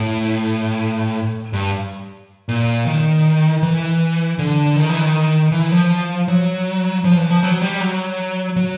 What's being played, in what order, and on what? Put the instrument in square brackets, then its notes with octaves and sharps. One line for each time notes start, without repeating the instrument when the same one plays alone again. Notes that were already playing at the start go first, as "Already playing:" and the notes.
Already playing: [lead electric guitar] A2
G2
A#2
D#3
E3
D3
D#3
E3
D#3
E3
F3
F#3
F3
E3
F3
F#3
G3
F#3
F#3